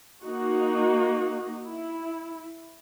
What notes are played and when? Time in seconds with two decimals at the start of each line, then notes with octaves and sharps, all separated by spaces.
0.24 A#3 D#4 F#4
1.66 E4